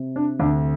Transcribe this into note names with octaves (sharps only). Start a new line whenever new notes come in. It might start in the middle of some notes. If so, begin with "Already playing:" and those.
Already playing: C3
D4
D2 D4